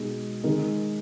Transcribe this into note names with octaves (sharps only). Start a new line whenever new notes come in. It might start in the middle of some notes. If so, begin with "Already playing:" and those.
Already playing: B2 G#3 D#4 G#4
D#3 G#3 D#4 A#4